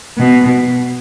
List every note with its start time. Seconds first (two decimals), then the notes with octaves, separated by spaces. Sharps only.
0.18 B2